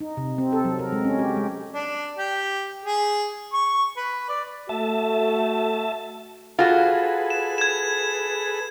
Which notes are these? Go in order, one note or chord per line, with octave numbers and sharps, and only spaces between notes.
D#4
C3
C4
A4
F#3
A#4
G#3
C#4
G4
G#3
D4
G4
G#4
C#6
B4
D5
A3 F#4 E5 A5
F4 F#4 G#4 A4 B4
E7
G#6 E7